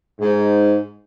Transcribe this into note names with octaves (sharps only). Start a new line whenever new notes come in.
G#2